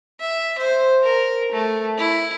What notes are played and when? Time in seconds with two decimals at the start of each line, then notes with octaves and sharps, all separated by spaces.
0.20 E5
0.58 C5
1.03 A#4
1.52 A3
1.98 E4